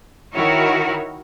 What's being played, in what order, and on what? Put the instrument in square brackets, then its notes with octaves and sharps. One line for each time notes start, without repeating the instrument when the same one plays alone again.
[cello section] D#3 E4 F#4 A#4 C#5